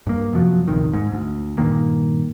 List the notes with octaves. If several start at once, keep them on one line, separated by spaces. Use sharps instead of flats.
G2 A#3
F#2 C3 F3 F#3
A#1 E2 C3 D#3
G#2
D2
G2 A#2 D#3 A#3